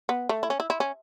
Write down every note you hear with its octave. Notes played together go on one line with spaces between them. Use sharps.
B3
A3
E4
C#4
E4
E4
C#4